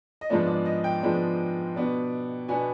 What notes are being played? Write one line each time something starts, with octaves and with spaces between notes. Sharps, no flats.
D#5
G#2 F3 G#3 B3 D4 D5
D5
D#5
G5
G#2 F3 G#3 B3 D4
B2 B3 D4
B2 B3 D4 G#5